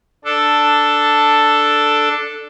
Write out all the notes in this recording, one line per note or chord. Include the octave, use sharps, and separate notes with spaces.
D4 A4